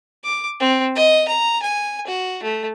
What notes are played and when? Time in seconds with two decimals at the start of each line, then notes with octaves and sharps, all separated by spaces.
0.24 D6
0.60 C4
0.95 D#5
1.28 A#5
1.62 G#5
2.06 F#4
2.43 A3